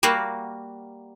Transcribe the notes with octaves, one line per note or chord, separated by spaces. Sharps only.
G3 A#3 F#4 F5 F#5